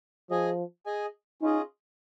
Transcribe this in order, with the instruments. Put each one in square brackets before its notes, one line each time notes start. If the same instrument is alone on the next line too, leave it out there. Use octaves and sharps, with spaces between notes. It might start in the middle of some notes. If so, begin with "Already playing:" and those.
[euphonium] F3 [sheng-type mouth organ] G#4 D#5 G#5
[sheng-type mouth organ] G#4 D#5 G#5
[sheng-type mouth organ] C#4 F4 G#4 D#5 [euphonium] D#4